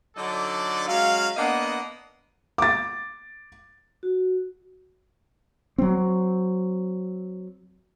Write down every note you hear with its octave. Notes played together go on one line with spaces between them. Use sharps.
D3 F#3 D4 D#4 A4 D5
F#3 G#3 C#4 F5
A#3 B3 D4 D#5 F#5
D6 A6
F#4
F#3 C4